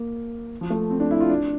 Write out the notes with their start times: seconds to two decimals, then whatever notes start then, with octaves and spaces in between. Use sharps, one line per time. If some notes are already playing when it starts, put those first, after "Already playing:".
Already playing: A#3
0.61 F3
0.70 A3
0.90 C4
1.00 D4
1.11 E4
1.21 F4
1.29 D4